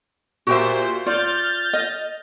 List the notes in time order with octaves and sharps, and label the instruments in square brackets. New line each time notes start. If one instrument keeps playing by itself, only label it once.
[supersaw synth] A#2 C5 [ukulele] F#4 G4 E5
[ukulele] F4 D5 [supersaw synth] F6 G6 A6
[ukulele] D#5